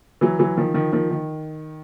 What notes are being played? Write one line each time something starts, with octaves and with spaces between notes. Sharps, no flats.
E3 F#3
E3 F#3
D#3 F3
D#3 F3
D#3 F3
D#3